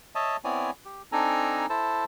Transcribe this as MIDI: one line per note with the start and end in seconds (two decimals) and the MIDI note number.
0.15 0.36 73
0.15 0.36 75
0.15 0.36 76
0.15 0.36 81
0.44 0.71 59
0.44 0.71 60
0.44 0.71 64
0.44 0.71 73
0.44 0.71 74
0.44 0.71 80
0.86 1.02 67
1.12 1.66 60
1.12 1.66 62
1.12 1.66 63
1.12 1.66 69
1.12 1.66 80
1.12 1.66 82
1.70 2.04 64
1.70 2.04 69
1.70 2.04 72
1.70 2.04 81